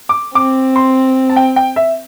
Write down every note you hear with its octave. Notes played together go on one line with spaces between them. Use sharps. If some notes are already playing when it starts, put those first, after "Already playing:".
D6
C4 D6
C6
A5
G5
G5
E5